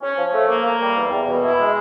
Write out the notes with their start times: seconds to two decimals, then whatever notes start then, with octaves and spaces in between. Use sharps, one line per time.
0.02 C#4
0.18 F3
0.32 A3
0.48 A#3
0.64 A#3
0.81 G3
0.96 E2
1.12 E2
1.27 B2
1.43 E4
1.59 G#3